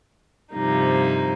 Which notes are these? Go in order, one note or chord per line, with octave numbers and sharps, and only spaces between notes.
G2 C3 F3 G3 A#3 D#4